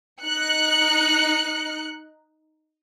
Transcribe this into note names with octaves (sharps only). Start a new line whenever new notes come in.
D#4 F#6 C#7